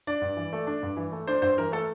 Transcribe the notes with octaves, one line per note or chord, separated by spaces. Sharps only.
D4 D5
G2
E3
A3
D4
G2
E3
A3
D4 C5
G2 C5
E3 A#4
A3 A4